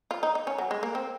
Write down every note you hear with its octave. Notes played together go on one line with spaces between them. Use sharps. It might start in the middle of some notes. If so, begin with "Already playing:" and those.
F4
D#4
D#4
C#4
F#3
G#3
A#3
C4